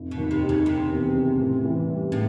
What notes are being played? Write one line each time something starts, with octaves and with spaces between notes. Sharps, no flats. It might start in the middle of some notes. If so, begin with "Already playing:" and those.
Already playing: F1
B2
D#2
C3
D#3
C#3
E1 C3
E2
C#3
A2
E3
G3
A2 C#3